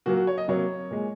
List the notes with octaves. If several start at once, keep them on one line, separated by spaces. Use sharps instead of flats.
A#2 F#3 A#3 F#4
F#4
C#5
D#5
C3 F#3 A#3 C#5
A#2 G#3